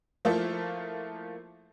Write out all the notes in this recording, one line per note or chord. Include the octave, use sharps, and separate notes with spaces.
F3 A3 A#3 E4 F4 A4